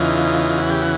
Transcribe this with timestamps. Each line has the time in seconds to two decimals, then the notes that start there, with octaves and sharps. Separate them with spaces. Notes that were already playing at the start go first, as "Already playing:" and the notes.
Already playing: E2 C#3 E3 D#4 F4
0.57 F#4
0.70 G4
0.82 F#4